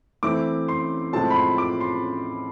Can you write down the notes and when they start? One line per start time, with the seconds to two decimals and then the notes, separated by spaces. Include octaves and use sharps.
0.23 E3 A3 C4 E4 D6
0.68 C6
1.13 A2 F3 G#3 C4 F4 A5
1.30 B5
1.36 C6
1.58 D6
1.81 C6